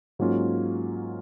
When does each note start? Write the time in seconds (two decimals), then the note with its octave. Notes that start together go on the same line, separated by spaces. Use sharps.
0.19 G#2 F#3 A#3 C#4 F4